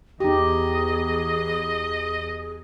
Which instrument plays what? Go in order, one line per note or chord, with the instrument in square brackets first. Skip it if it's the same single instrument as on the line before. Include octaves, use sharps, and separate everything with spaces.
[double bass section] E2 [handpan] D#4 G4 [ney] G#4 [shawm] D#5